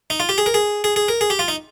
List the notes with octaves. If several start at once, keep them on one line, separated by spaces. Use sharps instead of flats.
D#4
F4
G4
G#4
A#4
G#4
G#4
G#4
A#4
G#4
G4
F4
D#4